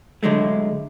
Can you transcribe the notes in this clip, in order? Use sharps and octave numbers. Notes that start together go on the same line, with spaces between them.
D3 F#3 G#3 A3